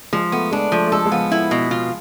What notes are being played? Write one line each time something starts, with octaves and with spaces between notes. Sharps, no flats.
F3 G#3
A3 B3
G#3 D4
F3 A3
A3
G#3 A4
G#3
F3 B3
E4
B2
F4